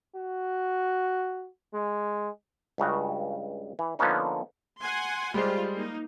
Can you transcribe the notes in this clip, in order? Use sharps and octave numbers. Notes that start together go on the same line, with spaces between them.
F#4
G#3
C#2 G2 C#3 F#4
E3
D3 F3 A#3 B3 C#4 D#4
F#5 G#5 C6
G3 G#3 F4 G4 C5
A#3 D#4